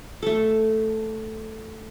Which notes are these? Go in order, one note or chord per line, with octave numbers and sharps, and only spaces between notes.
A3 A4